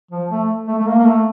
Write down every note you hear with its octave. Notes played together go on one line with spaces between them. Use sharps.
F3
A3
A3
A3
A#3
A#3
A3